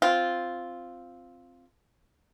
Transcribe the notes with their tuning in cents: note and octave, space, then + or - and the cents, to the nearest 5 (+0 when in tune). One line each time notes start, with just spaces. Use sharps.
C4 +0 F4 +0